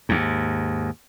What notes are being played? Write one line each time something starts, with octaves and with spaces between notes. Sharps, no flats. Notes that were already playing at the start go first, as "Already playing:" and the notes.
D#2 G#2